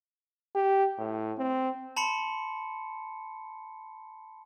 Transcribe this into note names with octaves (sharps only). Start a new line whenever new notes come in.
G4
A2
C4
A5 B5 C6 C#7